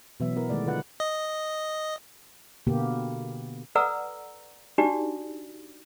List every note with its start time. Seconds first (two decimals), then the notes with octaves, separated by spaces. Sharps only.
0.20 B2 E3 F#3 B3 E5
0.36 B3 E4 A#4
0.50 D#3 G#3 A3 D5
0.66 D3 F4 B4 F#5
1.00 D#5
2.67 B2 D3 A#3 B3 G4
3.75 A4 B4 D5 F#5 A#5 E6
4.78 D4 D#4 F#4 G4 D5